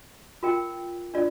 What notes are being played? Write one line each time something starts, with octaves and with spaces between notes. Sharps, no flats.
F4 A#4 G5
D4 F4 D5